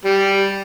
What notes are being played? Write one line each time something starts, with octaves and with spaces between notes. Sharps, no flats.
G3